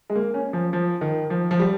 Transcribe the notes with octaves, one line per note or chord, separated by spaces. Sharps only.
G#3
A#3
C#4
F3
F3
D#3
F3
F3
G3